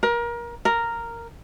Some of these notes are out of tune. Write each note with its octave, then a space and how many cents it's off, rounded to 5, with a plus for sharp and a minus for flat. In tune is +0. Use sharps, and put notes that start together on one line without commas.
A#4 +25
A#4 -5